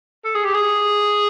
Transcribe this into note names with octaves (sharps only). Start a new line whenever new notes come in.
A4
G#4
G4
G#4